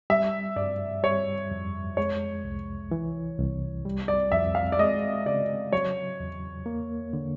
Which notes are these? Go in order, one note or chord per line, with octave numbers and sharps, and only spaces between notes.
G3 E5
G2 D5
G3 C#5
F2
G#3 C#5
C2
E3
C2
G3
D5
F2 E5
F5
D5
G#3 D#5
C#3 D5
F#3 C#5
E2
A#3
D3